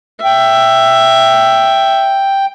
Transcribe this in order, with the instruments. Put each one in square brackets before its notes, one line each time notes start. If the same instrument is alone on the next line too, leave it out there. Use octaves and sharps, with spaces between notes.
[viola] E5 [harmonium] G5